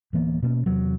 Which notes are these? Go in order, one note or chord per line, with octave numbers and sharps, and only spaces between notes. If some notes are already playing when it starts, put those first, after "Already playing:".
D1 E3 A#3 B3
B2 A#3 B3 C#4
E2 C3 F#3